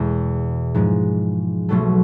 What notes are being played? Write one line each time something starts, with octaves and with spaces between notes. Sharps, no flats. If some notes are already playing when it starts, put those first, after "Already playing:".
Already playing: E2 B2 G#3
G#2 F3 G#3
B1 B2 F#3 A3